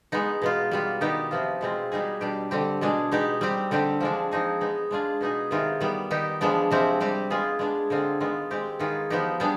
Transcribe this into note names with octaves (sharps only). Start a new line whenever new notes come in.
G#3 B3 D#4
B2 B3 F4
G3 B3 F4
D#3 B3 D#4 G4
C3 F3 B3 F4
B2 G#3 C4 F4
B2 G3 B3 D#4 G#4
B2 G3 D4 G4
D3 G3 C4 G4
B2 G#3 D4 G#4
G#3 B3 D#4 G4
G3 C4 G4
D3 G3 C4 G4
F3 G#3 D4
F3 C4 D#4 G#4
G#3 B3 D#4
G#3 D4 F4 G#4
B2 B3 D#4 G#4
C3 D#3 B3 F4 G#4
D#3 G3 B3
D#3 B3 D#4 G4
F3 G#3 B3 D4
C3 F3 G#3 C4 G4
G3 C4 G4
G#3 B3 F4 G#4
G#3 B3 D4 G#4
D3 G#3 C4 F4 G#4
D#3 G#3 B3 F4
G#3 C4 G4
D#3 B3 F4 G#4
F3 B3 D#4 G4
G3 B3 D4 G#4